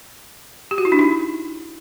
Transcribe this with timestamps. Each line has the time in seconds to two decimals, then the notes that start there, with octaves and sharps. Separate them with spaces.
0.71 G4
0.78 F#4
0.85 E4
0.92 D4
0.99 D#4